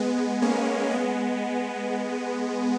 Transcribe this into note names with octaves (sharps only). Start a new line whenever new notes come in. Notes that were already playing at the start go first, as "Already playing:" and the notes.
Already playing: G#3 B3
A#3 C#4
G#3 B3